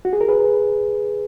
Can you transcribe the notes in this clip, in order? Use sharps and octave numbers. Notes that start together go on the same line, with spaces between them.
F#4
G#4
A#4
G#4 B4